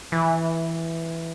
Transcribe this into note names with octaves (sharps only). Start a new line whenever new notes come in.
E3